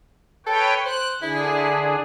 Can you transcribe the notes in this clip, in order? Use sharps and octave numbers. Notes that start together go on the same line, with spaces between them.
A4 B4 C#5 G5
C5 F#6
D3 D4 E4 G#4